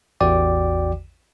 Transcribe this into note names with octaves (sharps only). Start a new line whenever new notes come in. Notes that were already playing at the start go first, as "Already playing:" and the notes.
A1 E2 F#4 D5 G5 D6